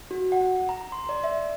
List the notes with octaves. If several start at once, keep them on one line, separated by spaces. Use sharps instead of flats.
F#4
F#5
A#5
C6
D5
E5